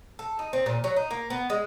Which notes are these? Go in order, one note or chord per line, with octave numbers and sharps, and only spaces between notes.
A4
D#4
C4
A#2
F#3
D#4
A#3
B3
G#3